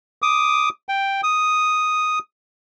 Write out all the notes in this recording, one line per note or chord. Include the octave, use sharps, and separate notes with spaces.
D6 D#6
G5
D#6